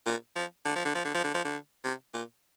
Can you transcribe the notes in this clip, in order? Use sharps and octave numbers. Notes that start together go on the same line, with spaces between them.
A#2
F3
D3
F3
D3
F3
D3
F3
D3
F3
D3
C3
A#2